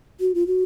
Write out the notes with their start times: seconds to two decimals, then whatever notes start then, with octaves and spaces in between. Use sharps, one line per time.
0.20 F#4
0.35 F4
0.47 F#4